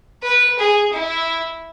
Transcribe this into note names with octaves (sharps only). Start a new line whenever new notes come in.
B4
G#4
E4